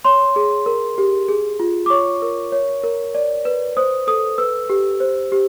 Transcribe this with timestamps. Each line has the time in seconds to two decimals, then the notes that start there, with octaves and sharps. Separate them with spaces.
0.05 C#5 C6
0.36 G#4
0.66 A#4
0.98 G4
1.28 G#4
1.60 F4
1.86 D6
1.90 C#5 C#6
2.22 A#4
2.52 C#5
2.83 A#4
3.15 D5
3.45 B4
3.77 C5 D#6
4.07 A4 D#6
4.38 B4 E6
4.70 G4
5.00 C5
5.32 G4